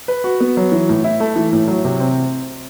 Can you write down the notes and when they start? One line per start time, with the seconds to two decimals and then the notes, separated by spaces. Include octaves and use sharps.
0.08 B4
0.24 F#4
0.40 B3
0.57 F#3
0.72 E3
0.89 A2
1.04 E4
1.20 A3
1.36 E3
1.53 A2
1.68 F#3
1.85 C3
2.00 C4